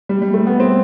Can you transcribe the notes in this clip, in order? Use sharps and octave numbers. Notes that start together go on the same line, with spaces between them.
G3
G3
A3
B3
C4